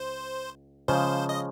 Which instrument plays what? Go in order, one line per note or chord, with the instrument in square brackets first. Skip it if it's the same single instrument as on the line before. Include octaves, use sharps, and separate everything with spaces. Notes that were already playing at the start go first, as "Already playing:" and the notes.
Already playing: [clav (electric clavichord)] C#2 [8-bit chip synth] C5
[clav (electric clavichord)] C#3 F3 G#3 [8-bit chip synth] C5
[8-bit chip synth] D#5